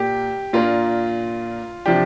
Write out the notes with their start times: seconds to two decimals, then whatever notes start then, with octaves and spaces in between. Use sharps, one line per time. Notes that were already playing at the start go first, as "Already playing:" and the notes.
Already playing: A#2 A#3 G4
0.53 A#2 A#3 D4 F4
1.86 C3 F3 D4 G4